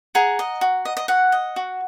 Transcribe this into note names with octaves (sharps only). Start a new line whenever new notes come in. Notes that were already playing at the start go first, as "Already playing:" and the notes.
G#4 F#5 A#5
D#5
F#4
D#5
D#5
F#4 F#5
D#5
F#4